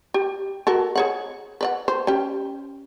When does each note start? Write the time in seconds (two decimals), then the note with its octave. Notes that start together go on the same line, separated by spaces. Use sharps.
0.14 G4
0.67 F#4 A4 A#4
0.96 G#4 C#5 F#5
1.61 B4 D5 F#5
1.88 C5
2.07 C#4 G4